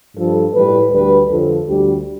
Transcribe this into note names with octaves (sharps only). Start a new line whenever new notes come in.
G2 F3 A4
A2 E3 G3 B4
D2 D3 G3 B4
F2 D3 F3 A4
D2 D3 G3 G4